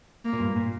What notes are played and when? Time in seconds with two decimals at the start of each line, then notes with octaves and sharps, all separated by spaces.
0.25 A#3
0.33 A#2
0.40 G2
0.56 A#2